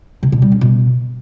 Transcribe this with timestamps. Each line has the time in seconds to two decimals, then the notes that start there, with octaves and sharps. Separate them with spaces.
0.23 C3
0.32 B2
0.42 G3
0.52 C#4
0.61 B2